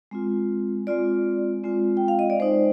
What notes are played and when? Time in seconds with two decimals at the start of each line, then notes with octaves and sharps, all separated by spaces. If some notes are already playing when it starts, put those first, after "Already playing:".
0.11 G#3 C4 F4
0.87 G#3 C4 F4 D5
1.64 G#3 C4 F4
1.97 G5
2.08 F5
2.19 D#5
2.30 D5
2.40 G#3 D#4 C5